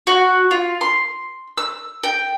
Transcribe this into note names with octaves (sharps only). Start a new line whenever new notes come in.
F#4
F4
C6
E6
G5